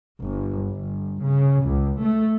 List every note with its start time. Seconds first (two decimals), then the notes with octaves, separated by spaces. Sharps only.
0.21 G1
0.69 G1
1.24 C#3
1.65 C#2
2.02 A3